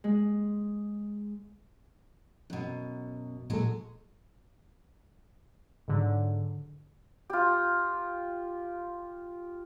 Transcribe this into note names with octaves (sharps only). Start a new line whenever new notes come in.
G#3
F#2 B2
A#2 F#3 G#3 G#4 A4
G#2 D3 F#3
F4 G4